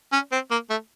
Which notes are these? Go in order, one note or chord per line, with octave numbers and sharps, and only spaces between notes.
C#4
C4
A#3
A3